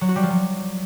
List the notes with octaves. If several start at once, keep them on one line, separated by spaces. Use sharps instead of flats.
F#3
F#4
G3
F3
F#3